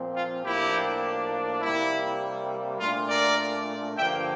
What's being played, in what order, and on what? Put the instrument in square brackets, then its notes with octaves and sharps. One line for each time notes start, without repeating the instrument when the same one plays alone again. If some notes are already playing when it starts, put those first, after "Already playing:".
Already playing: [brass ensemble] A#2 F3 C4
F4
A2 F3 A#3 D4 E4 G4
C3 G3 A#3 E4
A#2 A3 D4 F4
A#4 D5
G2 D3 F3 A#3 E5 G5